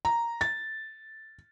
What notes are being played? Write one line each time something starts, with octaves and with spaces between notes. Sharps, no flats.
A#5
A6